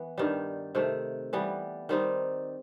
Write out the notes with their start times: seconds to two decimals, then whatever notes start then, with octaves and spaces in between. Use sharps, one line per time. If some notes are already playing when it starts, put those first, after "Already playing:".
Already playing: E3 B3
0.18 G2 D#3 G3
0.75 C3 D#3 A3
1.33 E3 G3 B3
1.89 D#3 G3 C4 D#4